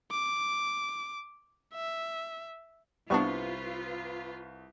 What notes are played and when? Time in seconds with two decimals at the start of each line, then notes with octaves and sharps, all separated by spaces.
0.11 D6
1.74 E5
3.10 C2 G3 B3 C4 D4 F4 B4 C#6